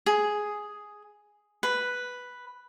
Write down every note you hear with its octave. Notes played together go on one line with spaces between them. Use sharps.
G#4
B4